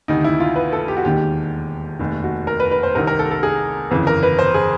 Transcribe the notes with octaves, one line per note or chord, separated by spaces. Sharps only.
D2 C3 D#3 D#4
E4
F4
B4
A4
G4
F#4
E1 D#2 D#3 G4
F1 D#2 D#3
F#4
A#4
B4
B4
C5
C2 C3 D#3 A#4
A#4
A4
A4
G#4
G1 F2 C#3 E3
A#4
B4
C5
G#4